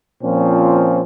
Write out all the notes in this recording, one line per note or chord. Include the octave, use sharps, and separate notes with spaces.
A#2 F3 C4 C#4